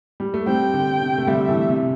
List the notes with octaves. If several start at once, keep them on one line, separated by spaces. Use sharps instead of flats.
G3
A3
G3 C4 G5
D3
C3
A3
D3 G3 E5
E3 A3
C3